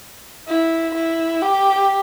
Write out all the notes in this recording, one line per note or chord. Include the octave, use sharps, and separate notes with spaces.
E4
E4
G4